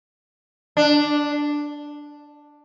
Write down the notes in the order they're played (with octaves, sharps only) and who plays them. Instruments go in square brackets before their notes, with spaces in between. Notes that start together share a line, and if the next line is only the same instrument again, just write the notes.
[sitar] D4